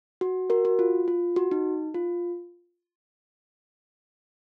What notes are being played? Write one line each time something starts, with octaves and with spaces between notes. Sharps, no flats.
F#4
F#4 A#4
F#4
F4
F4
F#4
D#4
F4